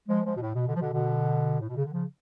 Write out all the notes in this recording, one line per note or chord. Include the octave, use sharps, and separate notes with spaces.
F3 G#3
F3 G#3
B2
A2
B2
B2 D3
F3
B2 D3
B2 D3
A2
B2
C#3
D3
C#3 F3